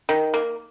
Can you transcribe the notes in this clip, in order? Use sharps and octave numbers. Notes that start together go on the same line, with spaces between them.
D#3
A#3